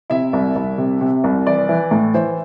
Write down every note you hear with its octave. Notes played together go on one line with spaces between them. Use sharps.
C3 E4 E5
C2
C2
C3
C3
C2
E3 D5
E3
A2
E3 C5